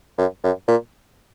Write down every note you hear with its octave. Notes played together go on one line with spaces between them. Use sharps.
F#2
F#2
A#2